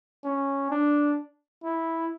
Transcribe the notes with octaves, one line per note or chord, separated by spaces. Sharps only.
C#4
D4
E4